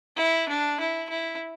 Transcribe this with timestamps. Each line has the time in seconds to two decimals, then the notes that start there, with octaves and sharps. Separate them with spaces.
0.17 E4
0.49 D4
0.80 E4
1.10 E4